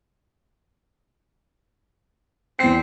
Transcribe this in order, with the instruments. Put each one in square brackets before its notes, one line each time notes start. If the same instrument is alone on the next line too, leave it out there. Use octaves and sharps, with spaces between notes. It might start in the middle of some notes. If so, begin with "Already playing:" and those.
[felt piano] E2 C7 [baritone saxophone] C4